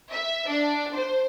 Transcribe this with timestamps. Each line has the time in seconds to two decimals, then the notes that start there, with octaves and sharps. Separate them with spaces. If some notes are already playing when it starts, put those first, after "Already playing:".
0.11 E5
0.47 D4
0.94 C5